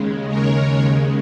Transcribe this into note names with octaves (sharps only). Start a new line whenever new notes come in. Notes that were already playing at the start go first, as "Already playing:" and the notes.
Already playing: D#2 C#3 G#3
A#4 C#5